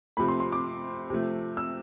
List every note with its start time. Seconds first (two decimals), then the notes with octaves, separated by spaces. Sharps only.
0.17 C3 F3 A3 B5
0.28 C6
0.40 C6
0.52 D6
1.10 C3 F3 A3
1.57 E6